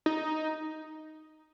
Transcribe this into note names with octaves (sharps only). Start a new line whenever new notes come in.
D#4